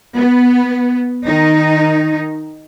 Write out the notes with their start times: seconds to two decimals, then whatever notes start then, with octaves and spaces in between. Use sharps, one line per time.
0.16 B3
1.26 D#3 D#4